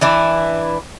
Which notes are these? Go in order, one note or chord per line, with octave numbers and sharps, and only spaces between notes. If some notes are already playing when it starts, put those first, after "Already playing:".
E3 D4 E4